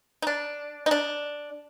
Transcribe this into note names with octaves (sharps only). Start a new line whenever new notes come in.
D#4
D4
D#4
D4